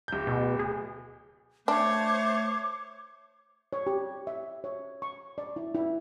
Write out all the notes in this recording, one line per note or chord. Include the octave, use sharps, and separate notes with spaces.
D1 G6
B2
G#4
A3 D4 C5 C#5 D6
C#5
G4
E5
C#5
C#6
D5
E4
E4